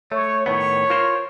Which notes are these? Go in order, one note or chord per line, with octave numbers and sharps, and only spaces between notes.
A3 C#5
A2 D#3 B3 C#5
F4 A#4 C5